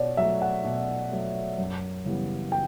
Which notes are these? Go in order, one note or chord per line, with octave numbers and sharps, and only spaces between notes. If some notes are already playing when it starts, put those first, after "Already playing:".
Already playing: B2 C#5 D5
F#3 A3 E5
F#5
B2
F#3 A3
F#2
C#3 E3 G3 B3
G5